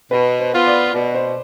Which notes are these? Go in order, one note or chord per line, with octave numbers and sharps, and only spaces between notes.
B2 B4
C5
B3 F4
D5
B2 D5
C5